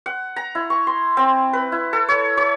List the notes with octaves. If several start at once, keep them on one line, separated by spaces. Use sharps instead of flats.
F#5
A#5
E4
C#6
C6
C4
B4
E4
A4
C#5
C#5